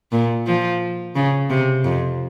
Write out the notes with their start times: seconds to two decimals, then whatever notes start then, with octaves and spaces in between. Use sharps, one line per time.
0.12 A#2
0.47 F3
1.16 C#3
1.50 C3
1.84 F2